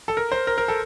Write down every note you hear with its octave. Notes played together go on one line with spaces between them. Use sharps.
A4
A#4
C5
A#4
A#4
A4